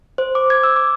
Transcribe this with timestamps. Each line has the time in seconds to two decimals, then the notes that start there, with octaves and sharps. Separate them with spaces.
0.18 C5
0.35 D6
0.50 G#6
0.64 E6
0.76 D6